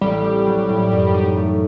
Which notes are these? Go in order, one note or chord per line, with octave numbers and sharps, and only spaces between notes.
A1 G3
C4
F#3
A2
F#2
D#4
A3